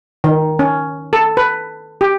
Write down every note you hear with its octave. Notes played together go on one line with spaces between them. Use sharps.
D#3
C#4
A4
B4
G4